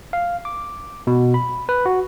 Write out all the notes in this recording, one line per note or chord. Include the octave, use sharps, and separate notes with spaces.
F5
D6
B2
B5
B4
F#4